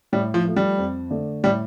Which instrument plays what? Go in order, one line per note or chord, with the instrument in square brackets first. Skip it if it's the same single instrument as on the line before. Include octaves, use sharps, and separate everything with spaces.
[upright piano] A2 [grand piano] G3
[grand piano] F3
[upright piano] F3 A3
[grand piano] G3
[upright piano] F2
D3 A3
[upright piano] A2 [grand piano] G3